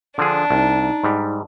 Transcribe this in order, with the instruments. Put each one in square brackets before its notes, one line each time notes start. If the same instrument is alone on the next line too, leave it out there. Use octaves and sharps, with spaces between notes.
[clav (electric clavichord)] D3 F3 G#4 [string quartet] D4
[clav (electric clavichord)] C2 [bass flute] D#4
[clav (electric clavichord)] G#2 G3